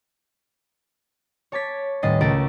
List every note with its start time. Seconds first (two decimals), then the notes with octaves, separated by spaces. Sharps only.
1.52 C#5 A5 D6 G#6 B6
2.02 D#1 A2 B4 D#5 A6 C7
2.21 C#2 A3 A#4 E6 A6 D7